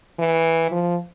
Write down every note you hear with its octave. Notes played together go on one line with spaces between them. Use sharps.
E3
F3